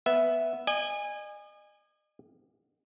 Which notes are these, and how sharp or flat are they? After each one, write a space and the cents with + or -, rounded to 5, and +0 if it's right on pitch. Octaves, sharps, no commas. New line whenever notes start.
B3 +0 E5 +0
D#5 -40 G#5 -15